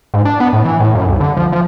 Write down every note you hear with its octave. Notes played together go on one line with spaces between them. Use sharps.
G#2
D4
B3
A2
E3
A2
F#2
C2
D3
F3
F3